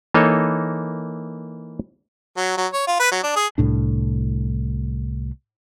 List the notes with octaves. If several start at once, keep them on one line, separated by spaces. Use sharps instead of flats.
E3 A#3 D#4 A4 C#5 D#5
F#3
F#3
C#5
F4
B4
F#3
D4
G#4
C2 A2 D4